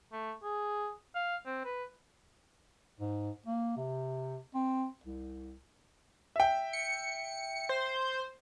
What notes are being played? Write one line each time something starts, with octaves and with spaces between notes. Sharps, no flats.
A3
G#4
F5
C4
B4
G#2
A#3
C3
C4
C2
E5 G5
C#7
C5